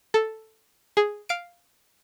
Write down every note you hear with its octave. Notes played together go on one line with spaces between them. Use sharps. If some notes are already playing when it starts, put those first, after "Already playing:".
A4
G#4
F5 D7